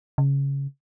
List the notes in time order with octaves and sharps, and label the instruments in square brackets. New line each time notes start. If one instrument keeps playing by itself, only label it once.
[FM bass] C#3